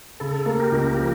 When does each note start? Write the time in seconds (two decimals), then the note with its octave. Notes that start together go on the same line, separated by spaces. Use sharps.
0.20 C#3 A4
0.46 A#3
0.60 G4 A#4
0.72 C#2
0.98 F3